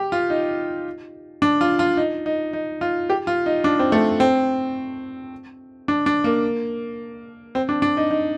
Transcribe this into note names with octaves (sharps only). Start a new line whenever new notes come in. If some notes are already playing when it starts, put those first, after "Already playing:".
Already playing: G4
F4
D#4
D4
F4
F4
D#4
D#4
D#4
F4
G4
F4
D#4
D4
C4
A3
C4
D4
D4
A#3
C4
D4
D4
D#4
D#4